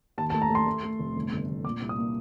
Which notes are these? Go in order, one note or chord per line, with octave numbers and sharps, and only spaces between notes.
D#2 A5
A5
A3
A#5
A3 C6
A3
A3
F1
G1
G1
G1
A#2 D6
C2
D#6
A#3